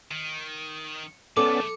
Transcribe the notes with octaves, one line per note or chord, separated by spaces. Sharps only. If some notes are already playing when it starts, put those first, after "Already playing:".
D#3
B1 A3 B3 C#4 A4 D5 D6